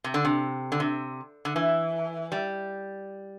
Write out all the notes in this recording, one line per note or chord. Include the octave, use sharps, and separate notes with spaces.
C3
D3
C3
D3
C3
D3
E3
G3